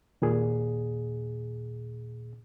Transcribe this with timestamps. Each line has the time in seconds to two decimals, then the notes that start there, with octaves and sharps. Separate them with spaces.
0.22 D#2 A#2 G#4